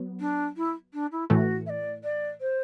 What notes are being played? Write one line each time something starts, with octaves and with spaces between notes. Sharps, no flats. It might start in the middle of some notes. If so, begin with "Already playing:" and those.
Already playing: F#3 B3
D4
E4
D4
E4
A2 E3 A3 F#4
E5
D5
D5
C5